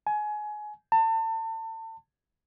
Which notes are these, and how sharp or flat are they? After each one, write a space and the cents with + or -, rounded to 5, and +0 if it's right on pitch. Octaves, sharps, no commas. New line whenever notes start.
G#5 +25
A5 +35